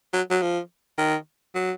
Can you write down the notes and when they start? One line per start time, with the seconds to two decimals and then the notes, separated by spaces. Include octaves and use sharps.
0.13 F#3
0.30 F#3
0.42 F3
0.98 D#3
1.55 F#3